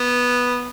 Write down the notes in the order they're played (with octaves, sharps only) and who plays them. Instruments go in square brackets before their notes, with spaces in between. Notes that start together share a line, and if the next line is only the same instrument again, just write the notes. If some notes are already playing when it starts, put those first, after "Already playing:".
Already playing: [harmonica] B3